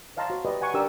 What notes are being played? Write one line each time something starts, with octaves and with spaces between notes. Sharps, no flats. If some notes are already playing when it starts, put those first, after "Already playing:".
C#5 D#5 F5 A5 A#5 C6
F#4 C5
G4 B4 D5 D#5
F#5 G#5 A#5 C#6
D4 G4 A#4 D5 D6 E6